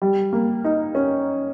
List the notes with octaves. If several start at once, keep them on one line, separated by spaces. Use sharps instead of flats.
G3
A#3
D#4
C#4